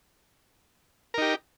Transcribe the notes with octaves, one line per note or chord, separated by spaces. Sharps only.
D#4 G4 A#4